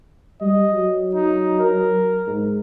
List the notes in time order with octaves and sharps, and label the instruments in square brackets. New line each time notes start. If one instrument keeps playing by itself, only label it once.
[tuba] G3 [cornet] D#5
[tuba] F#3
[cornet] D#4
A#4
[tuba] G#2